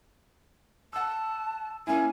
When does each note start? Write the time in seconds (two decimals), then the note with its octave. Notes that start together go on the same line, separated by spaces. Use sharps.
0.93 F#5 A5 E6
1.87 A#3 C#4 E4 G#5